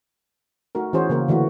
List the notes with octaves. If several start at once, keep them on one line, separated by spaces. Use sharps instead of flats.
A3 D#4 F#4 A#4
E3 C#4 F#4 G#4 C5 C#5
C#3 E3 A#3 A#4
D3 E3 A3 F#4